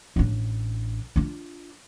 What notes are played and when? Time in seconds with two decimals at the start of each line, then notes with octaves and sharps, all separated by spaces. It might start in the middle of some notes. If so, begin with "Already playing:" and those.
0.16 A1 D4
1.16 D4 F4